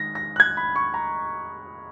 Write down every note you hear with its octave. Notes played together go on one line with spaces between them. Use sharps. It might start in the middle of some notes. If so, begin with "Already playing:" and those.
Already playing: D#3 G#3 A#6
A#6
F#6
G#6
B5
C#6
A#5